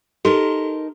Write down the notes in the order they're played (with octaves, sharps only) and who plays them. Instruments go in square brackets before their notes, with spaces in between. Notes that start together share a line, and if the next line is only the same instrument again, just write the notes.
[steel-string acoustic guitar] D#4 A#4 A5 [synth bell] G4 A4 C6